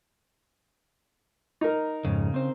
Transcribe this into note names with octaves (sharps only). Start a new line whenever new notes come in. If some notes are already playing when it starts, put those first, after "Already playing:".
D#4 A#4
F2 G#2 C#3
C4 C5